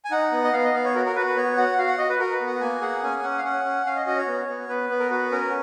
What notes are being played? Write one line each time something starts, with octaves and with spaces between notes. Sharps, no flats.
G#5
D#4 F#5
B3
D#5
B3 F5
D#5
B3 F5
C#5
F#4 A#4
A#4
F#4 B4
B4
B3 C#5
F#4 F#5
F#4 F5
F#5
F#4 D#5
B4
F#4 A#4
B4
B3
F#5
A#3 G#5
G#4 F#5
C#4 G#5
C#4 F#5
F5
C#4 F#5
C#4
C#4 F5
D#5
F#4 D#5
C#5
B3
B3
B3 B4
B3
A#4
F#4 B4
C#4 A#4